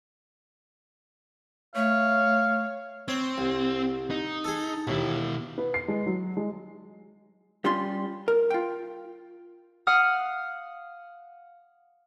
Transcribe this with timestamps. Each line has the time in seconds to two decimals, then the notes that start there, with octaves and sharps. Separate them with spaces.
1.76 A3 C#5 F5
3.08 C4 C#5
3.38 C2
4.11 D#4
4.44 G#4 A4
4.87 D#2 B2 E4
5.58 B3
5.74 C7
5.88 G#3
6.06 F#3
6.37 G#3
7.65 G3 C#4 F4 C6
8.28 A#4
8.50 F4 G5
9.87 F5 F#5 D#6 F6